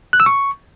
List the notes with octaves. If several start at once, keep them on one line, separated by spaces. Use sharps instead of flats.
F#6
E6
C#6